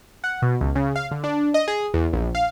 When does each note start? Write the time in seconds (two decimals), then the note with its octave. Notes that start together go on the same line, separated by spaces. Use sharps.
0.24 F#5
0.42 B2
0.61 C#2
0.75 C#3
0.96 F5
1.11 D3
1.24 D4
1.54 D#5
1.68 G#4
1.94 E2
2.13 A#1
2.35 F5